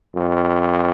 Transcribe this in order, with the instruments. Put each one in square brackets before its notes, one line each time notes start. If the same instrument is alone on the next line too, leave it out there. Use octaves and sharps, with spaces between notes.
[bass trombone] F2